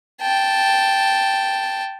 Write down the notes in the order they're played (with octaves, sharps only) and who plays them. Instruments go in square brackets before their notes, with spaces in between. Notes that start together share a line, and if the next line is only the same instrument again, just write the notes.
[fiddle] G5 A5